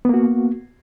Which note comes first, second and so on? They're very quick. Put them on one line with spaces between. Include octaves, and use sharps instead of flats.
B3 A#3 F#4